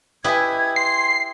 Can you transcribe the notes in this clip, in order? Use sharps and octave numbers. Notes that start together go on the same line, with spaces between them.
E4 G4 B4 D#5 E5 G#5 G#6
C6 C7